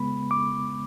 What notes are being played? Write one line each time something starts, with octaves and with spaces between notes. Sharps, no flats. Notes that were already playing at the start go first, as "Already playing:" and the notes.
Already playing: C#3 G#3 B3 B5
D6